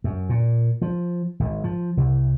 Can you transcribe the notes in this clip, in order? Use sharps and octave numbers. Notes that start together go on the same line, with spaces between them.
F#2
A#2
F3
G#1
F3
C2